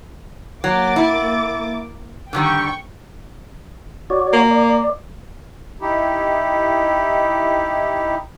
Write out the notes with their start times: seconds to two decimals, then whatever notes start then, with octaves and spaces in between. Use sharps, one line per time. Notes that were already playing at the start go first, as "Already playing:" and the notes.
0.64 F#3 A#3 D6 A6
0.96 E4
2.33 D3 D#3 G3 G5 C#6
4.10 F#4 C#5 D5
4.33 A#3
4.51 D5
5.80 D#4 E4 G4